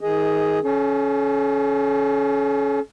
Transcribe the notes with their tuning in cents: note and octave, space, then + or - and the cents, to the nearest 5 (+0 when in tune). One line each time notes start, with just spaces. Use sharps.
D#3 +30 G#4 +0 D#5 +10
C#4 +0 A4 -45